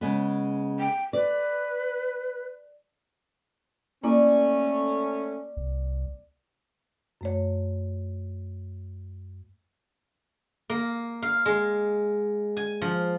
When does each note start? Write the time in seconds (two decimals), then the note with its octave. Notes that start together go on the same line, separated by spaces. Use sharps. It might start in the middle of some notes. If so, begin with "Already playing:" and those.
0.01 C#3 G#3 B3
0.79 G5
1.13 B4 D5
4.04 A3 A#3 C#4 E4 D5
5.57 C2
7.21 F#2 A3 C#5
10.70 A#3
11.22 F5
11.46 G#3
12.57 G#5
12.82 F3